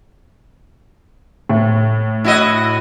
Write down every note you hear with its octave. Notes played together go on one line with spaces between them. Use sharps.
A2
E4 F#4 D#5